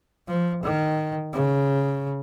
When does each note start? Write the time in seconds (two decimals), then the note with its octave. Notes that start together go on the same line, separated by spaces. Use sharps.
0.28 F3
0.64 D#3
1.34 C#3